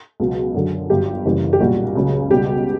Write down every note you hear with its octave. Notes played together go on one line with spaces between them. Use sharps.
C#2 B2 F#3
F#2 D3 F#3
G1 G2 F#3 G4
F#1 F#2 E3 G3
G4
B1 A#2 G3 F#4
C#2 C#3 F#3
C#2 B2 G3 G4